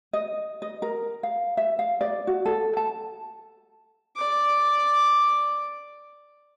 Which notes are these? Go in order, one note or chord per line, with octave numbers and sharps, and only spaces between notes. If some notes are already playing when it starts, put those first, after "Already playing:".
D#5
D#5
A#4
F5
E5
F5
D5
F#4
A4
A5
D5 D6